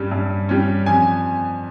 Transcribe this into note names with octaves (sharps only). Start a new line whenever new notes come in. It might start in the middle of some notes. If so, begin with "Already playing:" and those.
Already playing: G2 G3 C#4
G2
G3 C#4
F2 G#5